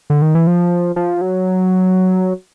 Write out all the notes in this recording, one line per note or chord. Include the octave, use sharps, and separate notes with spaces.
D3
D#3
E3
F3
F3
F#3